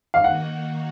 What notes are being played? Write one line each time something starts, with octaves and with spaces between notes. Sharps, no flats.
F5
D#3 A#3 D#4 F#4 F#5